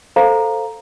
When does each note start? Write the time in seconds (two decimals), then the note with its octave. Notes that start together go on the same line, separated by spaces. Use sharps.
0.16 A4 C5 F5 A#5